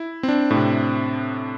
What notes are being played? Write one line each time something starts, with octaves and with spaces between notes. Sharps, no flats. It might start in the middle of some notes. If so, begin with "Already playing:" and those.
Already playing: E4
C4
D4
A2
C3